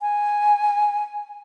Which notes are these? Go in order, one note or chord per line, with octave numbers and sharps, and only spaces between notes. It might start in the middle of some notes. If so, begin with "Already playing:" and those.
G#5